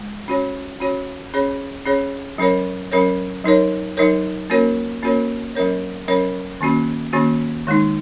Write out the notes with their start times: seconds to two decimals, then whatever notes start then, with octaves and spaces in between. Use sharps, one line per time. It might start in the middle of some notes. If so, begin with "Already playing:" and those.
Already playing: G#3
0.28 C#4 F#4 C#5
0.80 C#4 F#4 C#5
1.33 C#4 G#4 C#5
1.86 C#4 G#4 C#5
2.38 F#3 C#4 A#4 C#5
2.92 F#3 C#4 A#4 C#5
3.44 F#3 D#4 A#4 C#5
3.97 F#3 D#4 A#4 C#5
4.50 A#3 C#4 F#4 A#4 C#5
5.03 A#3 C#4 F#4 A#4 C#5
5.55 F#3 C#4 A#4 C#5
6.08 F#3 C#4 A#4 C#5
6.61 D#3 A#3 C#4 F#4
7.13 D#3 A#3 C#4 F#4
7.67 D#3 G#3 D#4